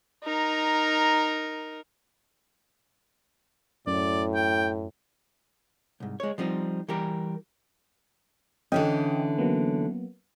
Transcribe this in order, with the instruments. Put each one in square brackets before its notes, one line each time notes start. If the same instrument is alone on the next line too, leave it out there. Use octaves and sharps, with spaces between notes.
[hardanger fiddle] D#4 A#4
[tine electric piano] F#2 [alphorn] A2 [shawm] D5
[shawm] G5
[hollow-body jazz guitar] C2 G#2
G#3 C#5
F3 G3 C4 D#4
E3 G3 G4 A#4
[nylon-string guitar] D3 E3 C#4 [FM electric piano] D#5 G5
[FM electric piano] F#3 A#3 B3